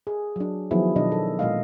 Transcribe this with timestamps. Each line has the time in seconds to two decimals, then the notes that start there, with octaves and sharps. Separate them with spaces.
0.07 G#4
0.36 F#3 D4
0.71 D#3 F3 F#3 B3 E4 G#4
0.96 B2 D#3 D4 D#5
1.12 A4
1.39 A#2 G#3 D#5 F5